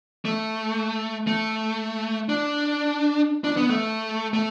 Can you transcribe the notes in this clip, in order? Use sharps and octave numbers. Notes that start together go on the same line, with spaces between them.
A3
A3
D4
D4
B3
A3
A3